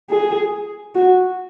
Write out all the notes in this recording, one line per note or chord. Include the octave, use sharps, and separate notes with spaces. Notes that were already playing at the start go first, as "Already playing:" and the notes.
G#4
F#4